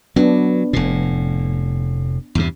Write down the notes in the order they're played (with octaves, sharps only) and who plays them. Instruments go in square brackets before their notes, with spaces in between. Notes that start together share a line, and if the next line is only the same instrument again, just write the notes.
[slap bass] F#3 [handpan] B3 D4
[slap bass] F1 A2
E2 G2 C3